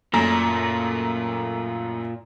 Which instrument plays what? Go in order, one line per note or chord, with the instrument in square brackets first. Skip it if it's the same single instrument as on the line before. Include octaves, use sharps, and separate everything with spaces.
[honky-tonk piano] F#2 A3 A#5 [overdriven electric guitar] A#2